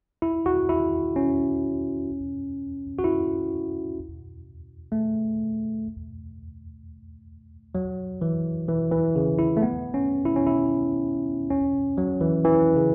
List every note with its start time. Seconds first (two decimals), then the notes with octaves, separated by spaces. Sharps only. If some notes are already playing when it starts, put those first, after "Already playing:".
0.22 E4
0.46 F#4
0.69 E4
1.16 C#4
2.99 F#4
3.04 E4
4.92 A3
7.75 F#3
8.22 E3
8.68 E3
8.91 E3
9.16 C#3
9.39 E4
9.57 A3
9.62 B3
9.94 C#4
10.26 E4
10.36 C#4
10.47 E4
11.50 C#4
11.98 F#3
12.21 E3
12.45 E3
12.76 C#3